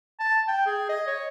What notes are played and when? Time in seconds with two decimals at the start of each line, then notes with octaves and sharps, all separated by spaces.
0.19 A5
0.48 G5
0.66 G#4
0.89 D#5
1.07 C#5